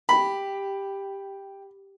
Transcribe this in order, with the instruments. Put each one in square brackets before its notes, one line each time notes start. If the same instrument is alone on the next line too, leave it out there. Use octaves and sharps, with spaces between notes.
[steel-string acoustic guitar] G4 [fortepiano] B5